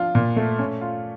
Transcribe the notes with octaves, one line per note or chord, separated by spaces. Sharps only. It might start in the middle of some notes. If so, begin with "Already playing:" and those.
Already playing: F3 D4 F4
A#2
A3
C#4
F4